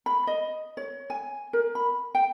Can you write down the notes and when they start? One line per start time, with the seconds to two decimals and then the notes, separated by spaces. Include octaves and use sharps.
0.06 B5
0.27 D#5
0.77 C#5
1.10 G#5
1.53 A#4
1.75 B5
2.15 G5